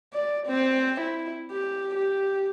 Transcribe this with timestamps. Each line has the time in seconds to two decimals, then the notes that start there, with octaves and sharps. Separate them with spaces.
0.13 D5
0.47 C4
1.00 E4
1.51 G4
1.95 G4